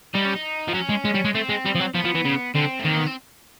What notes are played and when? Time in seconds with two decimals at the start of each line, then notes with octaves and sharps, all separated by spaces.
0.14 G3 D#4
0.24 C#4
0.35 D#4
0.68 F3
0.74 F#3 C#4
0.89 G#3
1.05 G#3
1.14 G3
1.25 G#3
1.34 A3 C4
1.49 G#3
1.65 G3
1.75 F3
1.80 F#3
1.95 F3 B3
2.05 F3
2.15 E3
2.25 C#3
2.55 D3 C4
2.79 A3
2.85 D#3 A#3
2.97 B3
3.07 C4